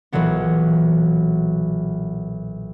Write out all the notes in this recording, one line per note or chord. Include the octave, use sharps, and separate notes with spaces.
B1 A#2 E3 F#3 B3